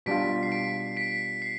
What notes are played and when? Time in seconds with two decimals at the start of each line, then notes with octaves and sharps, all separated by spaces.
0.06 B2 G3 D4 F4 B6 D7
0.43 C7
0.52 B6 D7
0.97 B6 D7
1.42 C7